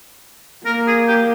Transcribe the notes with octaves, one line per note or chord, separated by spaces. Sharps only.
A#3 A#4
G#4
G4